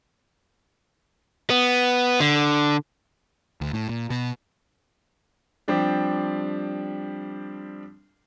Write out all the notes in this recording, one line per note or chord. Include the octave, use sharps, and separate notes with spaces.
B3
D3
D2
A2
A#2
B2
F3 G3 C4 D4 G4